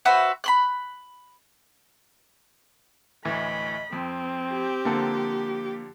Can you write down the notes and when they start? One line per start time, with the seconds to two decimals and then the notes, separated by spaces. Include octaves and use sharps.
0.05 F#4 B4 C5 E5
0.44 B5 C6 F#6
3.25 D2 A2 E3 D#5 B5
3.93 F2 C4
4.52 G4
4.85 D3 F3 A#3 A4